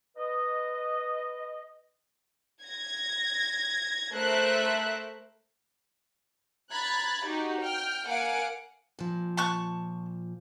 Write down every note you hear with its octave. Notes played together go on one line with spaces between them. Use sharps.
B4 D#5
G#6 A#6
A3 A#4 C5 E5 F#6
A#5 B5 F#6 G#6 A6
D#4 F#4 G4
G5 F6
A#3 F5 F#5 G#5 D7
A#2 F3
A5 C#6 F#6